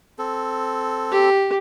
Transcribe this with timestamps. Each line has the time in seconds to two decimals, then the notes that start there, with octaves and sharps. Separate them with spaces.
0.18 C4 A4
1.11 G4